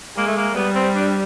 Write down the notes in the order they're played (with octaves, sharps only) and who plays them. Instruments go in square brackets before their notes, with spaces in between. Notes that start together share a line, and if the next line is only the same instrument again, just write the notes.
[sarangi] G#3 [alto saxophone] A#3
[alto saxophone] A3
A#3
[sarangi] G3 [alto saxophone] B3
[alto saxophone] C4
D4